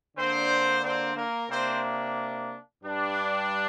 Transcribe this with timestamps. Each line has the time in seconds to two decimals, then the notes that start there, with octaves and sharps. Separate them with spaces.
0.16 D3 A#3 C4 D4 C5
0.83 C4 C5
1.16 A#3 A#4
1.50 C3 A#3 C4 D4 C5
2.84 G2 G3 D4